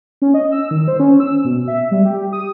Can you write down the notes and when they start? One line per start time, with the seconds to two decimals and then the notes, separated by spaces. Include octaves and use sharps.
0.22 C#4
0.34 D#5
0.52 E6
0.71 D#3
0.88 C5
1.00 C#4
1.20 E6
1.44 B2
1.68 E5
1.91 G3
2.05 G4
2.33 D#6